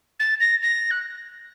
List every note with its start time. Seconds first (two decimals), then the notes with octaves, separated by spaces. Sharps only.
0.20 A6
0.40 A#6
0.62 A#6
0.91 F#6